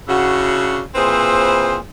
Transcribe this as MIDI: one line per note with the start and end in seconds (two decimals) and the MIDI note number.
0.08 0.80 49
0.08 0.80 62
0.08 0.80 64
0.08 0.80 66
0.95 1.76 46
0.95 1.76 60
0.95 1.76 64
0.95 1.76 68
0.95 1.76 71
0.95 1.76 72